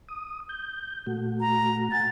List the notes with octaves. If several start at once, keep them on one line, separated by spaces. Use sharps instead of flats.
D#6
G6
A#2 A3 F#4
A#5
F#5 G#5 A6